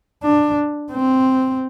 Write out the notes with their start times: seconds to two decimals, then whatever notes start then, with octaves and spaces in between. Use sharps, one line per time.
0.23 D4
0.92 C4